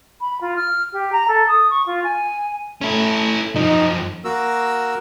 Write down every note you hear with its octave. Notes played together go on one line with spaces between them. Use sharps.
B5
F4
F6
G4
A#5
A4
D#6
C#6
F4
G#5
A3 C#4 E4
F#2 F3 D#4
A#3 F#4 A#4 E6